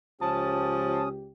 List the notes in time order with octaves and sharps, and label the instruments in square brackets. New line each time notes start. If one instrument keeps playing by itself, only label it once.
[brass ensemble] C#2 G4 [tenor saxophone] F3 [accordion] C#4 D#6 [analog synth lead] A5